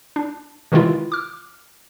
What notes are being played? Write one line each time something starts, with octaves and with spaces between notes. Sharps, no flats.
D4
C3 D#3 E3 G#3 E4 F4
D6 F6